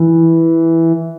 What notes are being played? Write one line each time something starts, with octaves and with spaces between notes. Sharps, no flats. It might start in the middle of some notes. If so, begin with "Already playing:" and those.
Already playing: E3